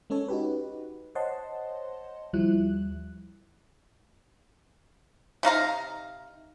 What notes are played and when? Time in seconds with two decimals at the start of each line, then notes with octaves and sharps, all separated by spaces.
0.10 G#3 C#4 A4 C#5
0.28 D#4 F#4 G4 B4
1.15 C5 C#5 D#5 F#5 A5 C6
2.33 D#2 F3 G3 E4 F#6
5.43 C3 D#4 F5 A#5